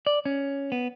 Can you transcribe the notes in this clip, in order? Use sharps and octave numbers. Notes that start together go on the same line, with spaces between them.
D5
C#4
B3